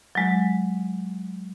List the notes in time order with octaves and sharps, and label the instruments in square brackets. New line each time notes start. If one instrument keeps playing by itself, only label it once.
[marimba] F#3 G#3